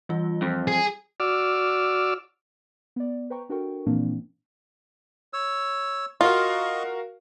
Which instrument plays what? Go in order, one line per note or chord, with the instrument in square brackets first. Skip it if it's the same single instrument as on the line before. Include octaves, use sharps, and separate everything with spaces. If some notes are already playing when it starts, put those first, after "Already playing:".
[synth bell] E3 G3 F4
[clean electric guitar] F2
[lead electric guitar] G#4
[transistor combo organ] F#4 D5 D6 E6 F6
[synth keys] B3 D5
B4 C5 G5 A#5 C#6
D4 F#4 A4 A#4 G5 C#6
A#2 E3 F3 A#3 C4 D4
[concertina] C#5 E6
[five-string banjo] F4 [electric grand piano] F#4 A#4 F5 [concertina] D#5 C6 C#6